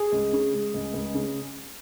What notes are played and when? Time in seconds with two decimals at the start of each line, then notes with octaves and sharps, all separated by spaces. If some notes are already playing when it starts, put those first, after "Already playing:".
Already playing: G#4
0.12 C#2
0.33 C#3
0.53 G#3
0.74 C#2
0.94 C#2
1.15 C#3